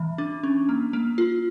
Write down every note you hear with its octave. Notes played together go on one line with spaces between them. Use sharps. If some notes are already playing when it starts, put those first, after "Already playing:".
Already playing: E3
D4
C#4
A#3
A#3
F4